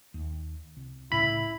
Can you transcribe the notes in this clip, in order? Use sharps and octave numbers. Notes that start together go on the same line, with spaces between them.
D#2
C2
C2 A2 C#3 E4 B5